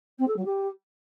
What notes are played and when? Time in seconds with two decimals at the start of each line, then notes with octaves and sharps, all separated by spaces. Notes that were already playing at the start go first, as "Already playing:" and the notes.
0.18 C4
0.27 A4
0.36 F#3
0.45 G4